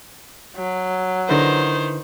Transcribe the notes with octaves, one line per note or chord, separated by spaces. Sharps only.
F#3
D3 D#3 E4 B4 C5